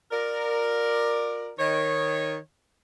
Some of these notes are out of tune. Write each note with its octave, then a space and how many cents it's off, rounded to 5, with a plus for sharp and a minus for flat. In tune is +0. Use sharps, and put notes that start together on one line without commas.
F4 +40 A#4 +0 D5 +15
D#3 +0 C#5 -15